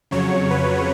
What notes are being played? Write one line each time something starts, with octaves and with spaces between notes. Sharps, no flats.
F2 C#3 F#3 C#5
B4